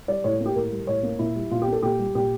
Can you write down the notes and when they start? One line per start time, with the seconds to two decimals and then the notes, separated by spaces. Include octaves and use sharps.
0.08 G3 D5
0.24 A2 C#5
0.40 A#3
0.46 G4
0.56 A2 A#4
0.72 G3
0.87 A2 C#5
1.03 A#3
1.19 A#2 E4
1.35 G3
1.51 A#2 F4
1.62 G4
1.68 A#3 A4
1.82 A#2 G4
1.99 G3
2.15 A#2 G4